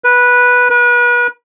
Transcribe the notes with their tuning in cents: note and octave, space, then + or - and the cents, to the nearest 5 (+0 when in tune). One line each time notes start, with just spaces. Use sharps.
B4 -10
B4 -35